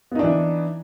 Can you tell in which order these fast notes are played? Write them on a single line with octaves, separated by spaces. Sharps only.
B3 D#4 D4 E3